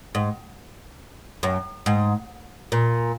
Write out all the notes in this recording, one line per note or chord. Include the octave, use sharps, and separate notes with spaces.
G#2
F#2
G#2
A#2